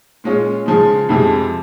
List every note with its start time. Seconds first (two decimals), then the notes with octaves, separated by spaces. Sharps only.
0.24 A#2 G#3 C#4 F4
0.66 C#3 F3 G#3
1.09 F2 C3 F3 G#3